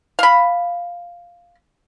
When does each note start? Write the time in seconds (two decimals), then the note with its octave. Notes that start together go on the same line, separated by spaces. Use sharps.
0.19 F5 B5